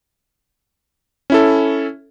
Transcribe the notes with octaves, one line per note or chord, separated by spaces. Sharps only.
C#4 E4 A4